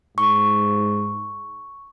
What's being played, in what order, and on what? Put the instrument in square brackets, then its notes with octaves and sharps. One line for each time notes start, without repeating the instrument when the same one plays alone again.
[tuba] G#2 [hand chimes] C#6